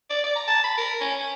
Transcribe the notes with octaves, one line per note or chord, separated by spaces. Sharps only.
D5
D5
A#5
A5
B5
A#4
C#4
C#4